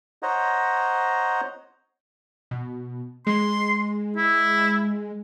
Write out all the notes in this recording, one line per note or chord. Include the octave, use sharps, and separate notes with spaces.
C5 C#5 D#5 F#5 A#5
B2
G#3 C6
E4